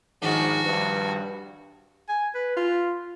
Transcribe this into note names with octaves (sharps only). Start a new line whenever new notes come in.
G#2 D#3 F3 D4 F#4
G2
G#5
B4
F4